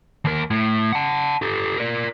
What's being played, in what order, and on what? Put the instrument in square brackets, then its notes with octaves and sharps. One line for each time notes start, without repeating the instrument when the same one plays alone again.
[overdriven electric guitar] D#2 A#4
A2
F#5 A5
G4 A4
A#4 D5